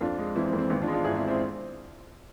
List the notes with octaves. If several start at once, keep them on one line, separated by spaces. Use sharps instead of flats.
F2 D4 F4
G#3
E3 C4 E4
C4
F2
C4
G#1 B3
D4 F4
G#3
D4 F4
G#2 E4 G#4
C4 E4
C4 E4